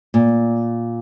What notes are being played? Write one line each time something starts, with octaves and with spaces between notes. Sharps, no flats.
A#2